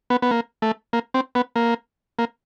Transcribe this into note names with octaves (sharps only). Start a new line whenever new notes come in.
B3
B3
A#3
A3
A#3
C4
B3
A#3
A#3